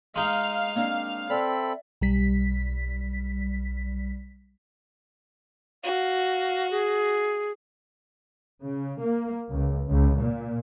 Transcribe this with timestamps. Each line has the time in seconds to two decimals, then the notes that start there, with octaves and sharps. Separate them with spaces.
0.16 G#3 D#4 F5
0.76 A#3 C4 D4
1.30 C4 A4 D5 E5 B5
2.01 B1 G3 B6
5.84 F#4 F5
6.71 G#4
8.62 C#3
9.01 A#3
9.50 C#2
9.88 C#2
10.17 A#2